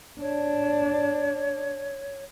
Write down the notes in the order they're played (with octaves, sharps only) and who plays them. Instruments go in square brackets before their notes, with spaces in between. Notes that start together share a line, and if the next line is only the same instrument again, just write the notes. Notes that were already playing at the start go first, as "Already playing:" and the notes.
[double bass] D4 [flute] C#5